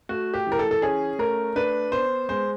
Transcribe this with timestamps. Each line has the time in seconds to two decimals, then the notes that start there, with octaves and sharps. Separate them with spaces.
0.09 A3 F#4
0.34 G4
0.47 E3
0.52 A#4
0.59 A4
0.71 A4
0.82 C#4 G#4
1.19 A3 A#4
1.56 D4 B4
1.92 B3 C5
2.29 G#3 C5